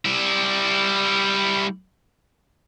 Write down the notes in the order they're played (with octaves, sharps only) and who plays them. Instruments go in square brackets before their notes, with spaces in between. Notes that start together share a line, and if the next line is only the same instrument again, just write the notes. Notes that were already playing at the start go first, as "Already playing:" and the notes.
[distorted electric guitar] G3 E4